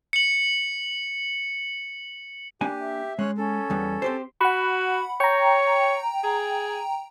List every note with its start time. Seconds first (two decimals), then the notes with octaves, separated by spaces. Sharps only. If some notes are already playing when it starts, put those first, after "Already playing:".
0.13 C#7 F#7
2.61 A#3 D4 G4 G#5
2.80 E5
3.19 G#3 C#4 C#5 F#6
3.37 C#4 A4
3.70 E2 G3 B3
4.02 C4 G4 C5
4.41 F#4 F#5 B5
5.20 C#5 G5 A#5
6.24 G#4